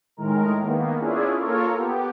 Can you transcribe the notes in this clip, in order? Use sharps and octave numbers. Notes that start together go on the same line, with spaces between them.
A2 D#3 G#3 A#4
D#3 A#3 B3
C#4 D4 E4 F4 G#4
A#3 F4 A4 A#4 C#5
B3 G4